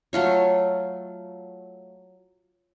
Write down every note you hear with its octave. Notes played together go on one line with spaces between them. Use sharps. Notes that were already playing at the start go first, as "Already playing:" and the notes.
F#3 A3 F4 C#5